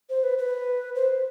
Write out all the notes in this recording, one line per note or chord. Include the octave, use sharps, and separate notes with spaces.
C5
B4
B4
C5